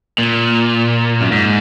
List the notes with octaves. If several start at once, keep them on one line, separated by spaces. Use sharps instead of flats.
A#2
F#2
G#2